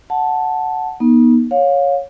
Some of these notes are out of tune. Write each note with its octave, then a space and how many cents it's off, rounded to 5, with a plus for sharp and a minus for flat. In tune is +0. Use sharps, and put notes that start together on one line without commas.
F#5 +0 A5 -5
B3 -40 D#4 +0
C#5 +0 F5 +25